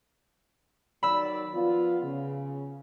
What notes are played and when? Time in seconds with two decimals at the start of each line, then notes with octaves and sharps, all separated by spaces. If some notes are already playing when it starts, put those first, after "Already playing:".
1.03 D#3 F#3 D5 B5 E6
1.54 F3 B3 F4
2.03 C#3